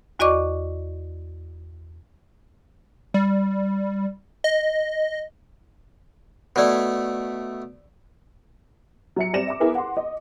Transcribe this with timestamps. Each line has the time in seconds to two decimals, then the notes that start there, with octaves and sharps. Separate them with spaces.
0.19 E2 F#4 D5 D#5 C#6 D6
3.14 G3
4.44 D#5
6.56 B2 A3 C5 D5
9.16 F#3 E5 C#7
9.33 G3 C4 D5 A#6 E7
9.47 E5 D6
9.60 B3 E4 G#4 A#4 B4
9.75 F#5 C6
9.97 D#5